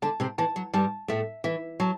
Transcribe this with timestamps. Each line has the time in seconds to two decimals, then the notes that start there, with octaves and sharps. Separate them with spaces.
0.02 D3 D4 A5
0.20 C3 C4
0.38 E3 A5
0.56 F#3
0.73 G2 G3 A5
1.08 A2 A3 E5
1.44 E3 E5
1.80 F#3 A5